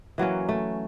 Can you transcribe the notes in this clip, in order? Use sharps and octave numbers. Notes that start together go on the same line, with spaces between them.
E3 F#3 A#3 C#4
A3